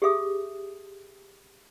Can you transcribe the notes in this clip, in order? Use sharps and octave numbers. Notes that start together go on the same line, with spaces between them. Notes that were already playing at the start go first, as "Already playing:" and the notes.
G4 G#4 E5 D#6